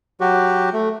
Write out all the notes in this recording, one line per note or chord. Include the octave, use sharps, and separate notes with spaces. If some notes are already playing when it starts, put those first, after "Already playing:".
F#3 F#4 G4
A3